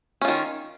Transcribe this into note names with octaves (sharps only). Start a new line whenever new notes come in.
D#3 C#4 F4